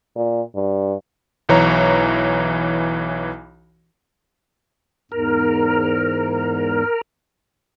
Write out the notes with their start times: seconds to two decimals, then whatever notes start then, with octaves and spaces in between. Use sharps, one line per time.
0.15 A#2
0.55 G2
1.49 B1 E3 C#5 A#5
5.12 E2 G#2 A#4